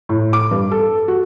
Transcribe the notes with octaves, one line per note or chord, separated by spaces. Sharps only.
A2
D6
G2
A4
F#4